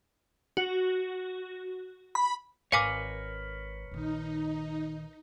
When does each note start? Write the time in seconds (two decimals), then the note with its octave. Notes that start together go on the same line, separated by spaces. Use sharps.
0.57 F#4
2.15 B5
2.72 G#1 A#4 B4 C#5 F5 G#5 D6
3.91 A#1 D#3 D#4